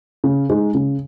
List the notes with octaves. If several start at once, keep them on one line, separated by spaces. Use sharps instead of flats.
C#3
G#3 D#4 G#4
C#3